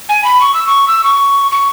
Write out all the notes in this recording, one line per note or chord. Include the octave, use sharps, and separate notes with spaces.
G#5
B5
C#6
E6
C#6
E6
C#6
C#6